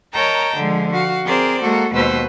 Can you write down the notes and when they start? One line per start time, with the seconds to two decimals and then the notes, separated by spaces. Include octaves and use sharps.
0.13 A#4 C#5 D#5 G5 A5 A#5
0.56 D3 F3 G#3
0.91 F#4 F5
1.25 C4 G#4 A#4 C5 D5
1.61 G#3 A#3 F#4 A4
1.93 D#2 B2 G#3 B4 C5 E6